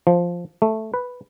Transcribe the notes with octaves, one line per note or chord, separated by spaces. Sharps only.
F3
A3
B4